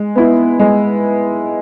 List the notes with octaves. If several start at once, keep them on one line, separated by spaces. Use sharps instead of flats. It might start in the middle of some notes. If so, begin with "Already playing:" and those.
Already playing: G#3
B3 E4
G#3